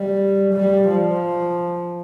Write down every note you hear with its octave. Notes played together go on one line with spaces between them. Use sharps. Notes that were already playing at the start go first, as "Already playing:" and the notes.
Already playing: G3
G3
F3